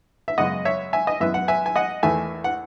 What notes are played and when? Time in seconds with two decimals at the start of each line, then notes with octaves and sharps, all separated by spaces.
0.28 E5
0.38 F#2 C#3 G#3 B3 D#5 F#5
0.65 C#5 E5
0.93 E5 G#5
1.07 D#5
1.20 F#2 E3 B3 E5
1.34 F#5
1.48 E5 G#5
1.66 G#5
1.76 D#5 F#5
2.03 E2 D#3 A3 E5 G#5
2.44 F#5